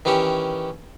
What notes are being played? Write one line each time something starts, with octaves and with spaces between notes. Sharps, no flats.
D#3 E3 C#4 G4 C#5